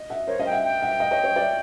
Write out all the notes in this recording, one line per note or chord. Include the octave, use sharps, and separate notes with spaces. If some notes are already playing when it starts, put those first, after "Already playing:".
Already playing: D#5
E5 F#5
A#4 C5 C#5
D#5 F5
G5
E5 F#5
G5
E5 F#5
D#5 F5
C#5 D#5
C#5 D#5
D5 E5